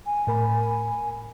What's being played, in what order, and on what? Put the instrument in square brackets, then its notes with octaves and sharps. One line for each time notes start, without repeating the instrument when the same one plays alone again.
[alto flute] G#5
[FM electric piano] A2 A#4 B5